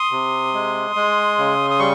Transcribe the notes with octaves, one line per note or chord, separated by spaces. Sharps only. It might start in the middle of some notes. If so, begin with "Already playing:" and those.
Already playing: C6 D#6
C3
G#3
G#3
C#3
D#6
G3 C#6